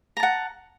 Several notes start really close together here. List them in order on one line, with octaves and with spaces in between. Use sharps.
A#5 A5 F#5